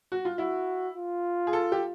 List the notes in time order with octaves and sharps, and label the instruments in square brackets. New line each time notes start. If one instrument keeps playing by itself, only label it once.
[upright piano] F#4
F4
[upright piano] E4 [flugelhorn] F#4
[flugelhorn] F4
[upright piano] G#4
A4
G4